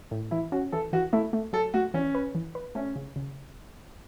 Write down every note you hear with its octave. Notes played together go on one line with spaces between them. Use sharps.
A2
E3 E4
C#4 F#4
E3 A4
E3 F#4
A3 E4
A3
F#3 A4
A3 F#4
E3 C#4
B4
E3
B4
A3 C#4
C#3
C#3